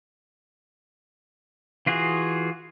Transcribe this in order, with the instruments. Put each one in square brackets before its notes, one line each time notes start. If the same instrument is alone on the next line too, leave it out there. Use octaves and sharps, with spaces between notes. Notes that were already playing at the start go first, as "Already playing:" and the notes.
[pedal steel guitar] E3 F4 F#4 G#4